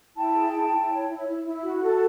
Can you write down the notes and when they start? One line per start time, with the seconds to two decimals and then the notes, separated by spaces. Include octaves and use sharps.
0.16 E4 G5 A5
0.35 G#4
0.53 E4
0.72 E4
0.91 C#5
1.09 E4
1.27 E4
1.46 E4
1.64 F#4
1.82 A4